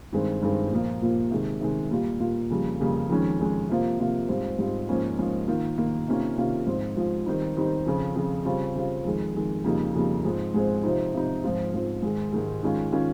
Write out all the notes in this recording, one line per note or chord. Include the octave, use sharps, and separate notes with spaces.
G2 D#3 G#3 C4
G2 D#3 G#3 C4
A#2 F3 A#3
A#2 F3 A#3
C3 D#3 G#3
C3 D#3 G#3
A#2 G3 A#3 F4
A#2 G3 A#3 F4
F2 C#3 G3 A#3
F2 C#3 G3 A#3
F2 D#3 G#3 C#4
F2 D#3 G#3 C#4
C3 F3 A#3 F4
C3 F3 A#3 F4
G#2 G3 C4 F4
G#2 G3 C4 F4
G#2 F3 A#3 C#4
G#2 F3 A#3 C#4
D#3 A#3 F4
D#3 A#3 F4
C3 D#3 A#3 C#4 F4
C3 D#3 A#3 C#4 F4
G#2 F3 C4 F4
G#2 F3 C4 F4
D#3 G3 C4 D#4
D#3 G3 C4 D#4
F2 C#3 F3
F2 C#3 F3
C#3 G3 C4 F4
C#3 G3 C4 F4
F2 D#3 G#3
F2 D#3 G#3
F2 C#3 G3 A#3 D#4
F2 C#3 G3 A#3 D#4
G#2 F3 G#3 C4
G#2 F3 G#3 C4
C3 F3 C4 D#4
C3 F3 C4 D#4
G#2 F3 C4 F4
G#2 F3 C4 F4
G#2 D#3 G#3
G#2 D#3 G#3
D#3 G#3 C#4 F4
D#3 G#3 C#4 F4